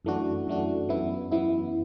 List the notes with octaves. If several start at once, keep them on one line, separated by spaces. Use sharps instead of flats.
F#2 E3 A3 D4 F#4
F#2 E3 A3 D4 F#4
F#2 E3 B3 E4
F#2 E3 B3 E4